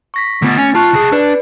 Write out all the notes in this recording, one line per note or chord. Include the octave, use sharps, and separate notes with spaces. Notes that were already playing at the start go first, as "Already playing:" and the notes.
C#6 A#6 B6
D3 A3 B3 A6
C#4
F4 A5 C#6 F#6
C2 G#4
D4 B4 D5